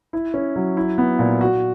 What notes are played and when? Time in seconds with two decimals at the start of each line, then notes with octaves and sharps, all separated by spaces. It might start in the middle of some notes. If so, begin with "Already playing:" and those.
0.13 E4
0.34 C#4
0.56 F#3
0.77 E4
0.98 B3
1.19 A#2
1.41 F#4